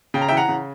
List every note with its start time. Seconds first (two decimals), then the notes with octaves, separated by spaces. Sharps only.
0.14 C#3 G5
0.21 A#5
0.28 E5 G5
0.32 E3
0.37 F#5 A#5
0.48 C#3